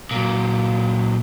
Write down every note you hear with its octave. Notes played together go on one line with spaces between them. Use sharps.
A#2 F#3